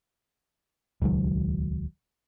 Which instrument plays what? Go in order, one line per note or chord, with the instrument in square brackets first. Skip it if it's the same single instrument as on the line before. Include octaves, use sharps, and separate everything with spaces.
[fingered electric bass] D#1 C#2 D#3 F#3